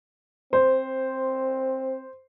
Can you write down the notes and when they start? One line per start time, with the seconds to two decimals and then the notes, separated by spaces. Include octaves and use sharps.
0.53 C4 C5